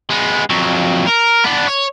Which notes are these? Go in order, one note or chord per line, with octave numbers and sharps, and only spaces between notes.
G#3 B3
F2 F#3
A#4
B3 D4
C#5